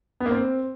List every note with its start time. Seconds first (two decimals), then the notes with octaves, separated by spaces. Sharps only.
0.20 B3
0.26 A#3
0.31 C4